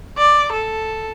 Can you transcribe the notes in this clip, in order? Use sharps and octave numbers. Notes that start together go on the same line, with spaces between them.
D5
A4